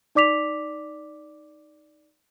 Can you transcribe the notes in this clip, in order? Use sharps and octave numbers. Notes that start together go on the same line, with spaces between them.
D#4 D5 D6 B6 F7